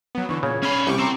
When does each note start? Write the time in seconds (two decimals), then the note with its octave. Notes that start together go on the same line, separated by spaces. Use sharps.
0.15 F#3 B3
0.29 D3 E3 C#6
0.43 A#2 C#3 C#5
0.63 C#4 G#5 B5
0.87 C2 G4 C#6 D6
0.99 C4 A#5